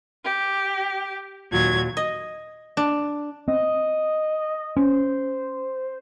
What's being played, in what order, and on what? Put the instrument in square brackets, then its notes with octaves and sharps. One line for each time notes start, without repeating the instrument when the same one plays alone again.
[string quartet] G4
D#2 A#2 F#3 G#6
[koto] D#5
D4
[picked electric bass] C4 [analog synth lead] D#5
[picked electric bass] C#4 [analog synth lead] C5